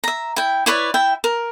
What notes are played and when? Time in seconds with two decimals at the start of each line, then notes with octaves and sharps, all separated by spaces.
0.04 E5 A#5
0.36 E4 G5
0.66 E4 B4 C#5 D5
0.94 E4 E5 G5
1.24 A#4